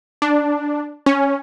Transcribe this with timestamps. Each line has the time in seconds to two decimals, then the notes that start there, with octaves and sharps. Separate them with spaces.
0.22 D4
1.06 C#4